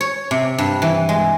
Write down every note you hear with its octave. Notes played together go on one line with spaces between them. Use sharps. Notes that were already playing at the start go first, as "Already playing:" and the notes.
C#5
C3
G2
E3
G#3